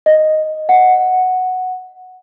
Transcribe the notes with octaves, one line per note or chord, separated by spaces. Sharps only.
D#5
F#5